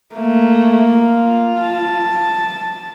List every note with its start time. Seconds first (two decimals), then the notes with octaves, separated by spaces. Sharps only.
0.15 A3 A#3
0.94 F4
1.59 A5